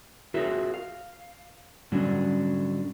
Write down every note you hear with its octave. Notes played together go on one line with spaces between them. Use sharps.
F4 F#4 G#4 A#4 C#5 E5
F5
G#2 D3 F#3 G3 C#4 D4